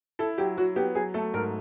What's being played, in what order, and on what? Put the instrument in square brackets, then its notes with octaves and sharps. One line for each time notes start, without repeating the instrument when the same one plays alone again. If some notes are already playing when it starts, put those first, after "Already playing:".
[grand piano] E4 [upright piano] A4
[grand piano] F#3 [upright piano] G4
[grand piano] F#3 [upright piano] F#4
[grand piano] B3 [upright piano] G4
[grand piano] F#3 [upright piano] G#4
[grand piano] A3 [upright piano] A4
[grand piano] G#2 [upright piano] A#4